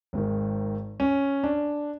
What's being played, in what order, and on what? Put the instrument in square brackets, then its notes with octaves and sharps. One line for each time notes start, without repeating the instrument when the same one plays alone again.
[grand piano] G#1 G#2 D#3
C#4
D4